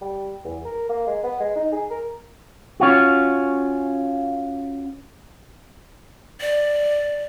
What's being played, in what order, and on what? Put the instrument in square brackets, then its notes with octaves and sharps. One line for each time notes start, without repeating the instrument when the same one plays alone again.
[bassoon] G3
E2
A#4
A#3
G#3
B3
G#3
D#4
G#4
A#4
[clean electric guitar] C#4 F4 F#4
[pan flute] D5